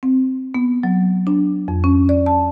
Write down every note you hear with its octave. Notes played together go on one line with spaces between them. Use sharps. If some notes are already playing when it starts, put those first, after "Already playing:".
C4
B3
F#3
D4
F2
C#4
D5
A5